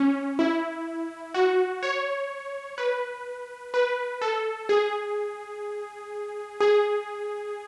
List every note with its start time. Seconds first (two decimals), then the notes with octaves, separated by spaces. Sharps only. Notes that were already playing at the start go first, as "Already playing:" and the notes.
Already playing: C#4
0.39 E4
1.34 F#4
1.83 C#5
2.78 B4
3.74 B4
4.22 A4
4.69 G#4
6.60 G#4